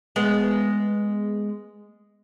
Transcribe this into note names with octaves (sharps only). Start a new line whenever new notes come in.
G#3 B3